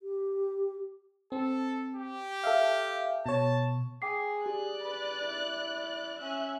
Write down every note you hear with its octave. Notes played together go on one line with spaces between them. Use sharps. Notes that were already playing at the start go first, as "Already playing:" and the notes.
G4
C4 A4
G4
A4 E5 F5
B2 C#5 A5
G#4 G5 D6 C7
G4 D5 F#6
B4
E4
C#4 E5 F#6